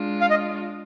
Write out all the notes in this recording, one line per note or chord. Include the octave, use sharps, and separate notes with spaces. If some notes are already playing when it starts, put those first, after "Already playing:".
Already playing: G#3 D4 F4
F5
D#5